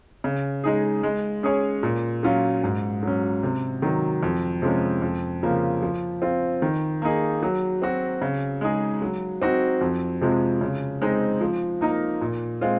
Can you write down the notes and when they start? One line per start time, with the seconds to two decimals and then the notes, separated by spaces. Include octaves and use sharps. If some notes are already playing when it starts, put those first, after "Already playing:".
0.24 C#3
0.64 G#3 D#4 G#4
1.03 G#3
1.43 C#4 G#4 C#5
1.83 A#2
2.23 F#3 C#4 F4
2.64 G#2
3.03 F#3 C#4
3.43 C3
3.82 D#3 F#3
4.23 F2
4.62 C3 F3 G#3 C#4
5.02 F2
5.43 C#3 F3 A#3
5.83 F3
6.22 C4 F4
6.62 D#3
7.02 A#3 D#4 G#4
7.43 F#3
7.82 C4 F#4
8.22 C#3
8.61 G#3 D#4 G#4
9.02 F#3
9.42 C4 D#4 F#4
9.81 F2
10.21 C3 F3 G#3
10.61 C#3
11.02 G#3 C4 D#4
11.41 F3
11.81 A#3 D#4 A#4
12.21 A#2
12.61 G#3 C4 F4